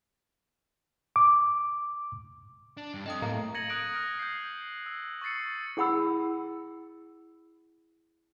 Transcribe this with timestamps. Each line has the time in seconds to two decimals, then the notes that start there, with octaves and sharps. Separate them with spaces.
1.16 D6
2.77 D4
2.94 G2
3.06 C4 A4 D#5 G5 D#6
3.22 A2 A#3
3.54 G#6 A#6 C#7 D#7 F#7
3.69 D#6 F#6 G#6 A#6 D7
3.94 F6 A#6 D7
4.19 G6 C7
4.86 E6
5.21 C#6 E6 A6 C7 C#7
5.77 E4 G#4 F#5 B5 E6